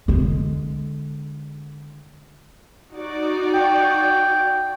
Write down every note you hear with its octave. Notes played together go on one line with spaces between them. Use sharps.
D3 G#3
D#4 F#4 D5
G5